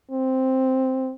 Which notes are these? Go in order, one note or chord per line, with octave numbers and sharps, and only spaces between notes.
C4